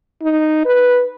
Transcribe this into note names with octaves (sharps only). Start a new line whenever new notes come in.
D#4
B4